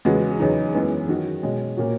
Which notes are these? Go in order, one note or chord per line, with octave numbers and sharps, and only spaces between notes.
E2 C#3 G#3 B3 F#4
E2 C#3 F#3 B3 D#4
F#2 E3 G#3 B3
D#3 F#3 C#4 F#4
B2 G#3 C#4
A#2 A#3 C#4 F#4